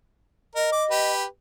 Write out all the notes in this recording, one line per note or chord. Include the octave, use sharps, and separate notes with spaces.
A#4 D#5
D6
G4 B4